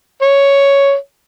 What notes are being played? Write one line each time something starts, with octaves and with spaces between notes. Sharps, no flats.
C#5